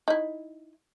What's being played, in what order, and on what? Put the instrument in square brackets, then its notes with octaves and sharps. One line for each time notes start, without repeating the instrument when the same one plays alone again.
[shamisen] D#4 E4